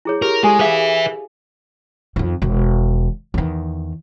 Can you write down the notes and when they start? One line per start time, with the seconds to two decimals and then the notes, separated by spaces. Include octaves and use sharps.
0.05 E4 G#4 C#5
0.22 G4 A#4
0.44 G#3 G4 A4 G#5
0.59 G#4 B4 E5 F5
2.16 F2 D#3
2.42 E1 D#3
3.34 E2 D#3